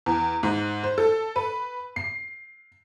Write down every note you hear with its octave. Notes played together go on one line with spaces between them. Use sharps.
E2
G#2
C5
A4
B4
C7